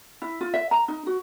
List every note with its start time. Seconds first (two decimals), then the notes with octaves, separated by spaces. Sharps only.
0.22 E4
0.41 F4
0.54 E5
0.71 A#5
0.88 D#4
1.07 F#4